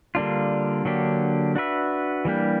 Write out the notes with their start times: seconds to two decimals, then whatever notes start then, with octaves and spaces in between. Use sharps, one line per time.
0.15 D3 G3 A#3 D4 F4
0.85 D3 F#3 A#3 D4 G4
1.55 D4 F#4 B4 E5
2.25 E3 G3 A#3 D4 G4